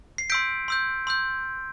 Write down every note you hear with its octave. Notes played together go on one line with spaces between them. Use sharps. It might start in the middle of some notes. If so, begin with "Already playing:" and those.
C7
C6 E6 G6 B6 D7
C6 E6 G6
C6 E6 G6